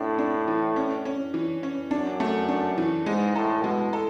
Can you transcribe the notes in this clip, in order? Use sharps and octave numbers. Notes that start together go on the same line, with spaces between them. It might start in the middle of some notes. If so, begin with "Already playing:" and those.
Already playing: A2 D4
D4
E3
C#4
C#4
E3
C#4
F#2 D4
A3
D4
E3
G#2 G#3
A2 A4
B2 G#3
A4